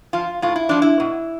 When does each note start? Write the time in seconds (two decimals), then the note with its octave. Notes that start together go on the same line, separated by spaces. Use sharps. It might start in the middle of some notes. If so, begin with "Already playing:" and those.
0.13 F3 F4
0.42 A2 F4
0.56 E4
0.69 F3 D4
0.82 E4
1.00 B2